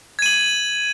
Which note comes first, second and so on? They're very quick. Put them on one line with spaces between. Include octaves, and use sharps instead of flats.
G#6 D#7 F#7